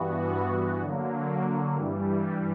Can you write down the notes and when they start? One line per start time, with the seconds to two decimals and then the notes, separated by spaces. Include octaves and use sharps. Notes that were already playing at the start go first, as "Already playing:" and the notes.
Already playing: G2 E3 B3 F#4
0.81 D3 F#3 A#3
1.76 G2 E3 G3